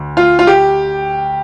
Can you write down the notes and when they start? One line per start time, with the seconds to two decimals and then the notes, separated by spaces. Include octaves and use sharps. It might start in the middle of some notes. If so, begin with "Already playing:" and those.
Already playing: D2
0.17 F4
0.39 F4
0.47 G4